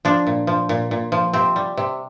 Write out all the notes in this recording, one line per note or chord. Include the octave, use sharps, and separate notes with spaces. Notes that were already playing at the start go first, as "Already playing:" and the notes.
F3 D4
A#2
F3
A#2
A#2
F3
C3 C4
G3
C3